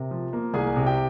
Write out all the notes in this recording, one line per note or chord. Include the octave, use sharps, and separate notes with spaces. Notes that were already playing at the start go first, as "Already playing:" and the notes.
Already playing: C3 A#4
F3
A#3
C2 G#4 G#5
C3
G4 G5